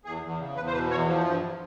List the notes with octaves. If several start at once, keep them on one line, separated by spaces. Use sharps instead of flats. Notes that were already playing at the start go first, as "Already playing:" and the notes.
E2 G#4
E2
C#3
E2 B4
C5
B2 B4
E2 C#5
F3
G2